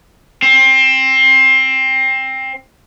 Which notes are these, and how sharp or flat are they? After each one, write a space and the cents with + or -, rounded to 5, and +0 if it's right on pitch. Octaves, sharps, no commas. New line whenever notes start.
C4 +20